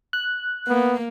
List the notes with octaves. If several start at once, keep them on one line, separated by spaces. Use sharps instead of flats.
F#6
A#3 B3